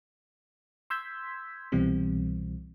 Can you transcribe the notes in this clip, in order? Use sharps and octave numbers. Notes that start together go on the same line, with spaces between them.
C6 E6 G6 G#6 B6
C2 B2 E3 G3 C4